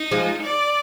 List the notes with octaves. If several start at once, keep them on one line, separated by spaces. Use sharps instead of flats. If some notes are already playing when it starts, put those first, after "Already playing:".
Already playing: D#4
F3 G#3
D5